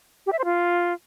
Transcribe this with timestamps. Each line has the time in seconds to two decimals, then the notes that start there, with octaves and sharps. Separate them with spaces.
0.26 G4
0.32 E5
0.39 C5
0.45 F4